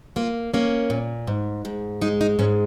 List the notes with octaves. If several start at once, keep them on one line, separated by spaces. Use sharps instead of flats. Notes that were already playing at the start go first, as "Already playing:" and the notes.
A#3 F4
A#3 C#4
A#2
G#2
G#2
G#3 D#4
D#4
G#2 C#4